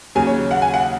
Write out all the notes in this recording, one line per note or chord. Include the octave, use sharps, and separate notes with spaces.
D#2 C#3 F#3 G#5
C#5
F#5
G#5
F#5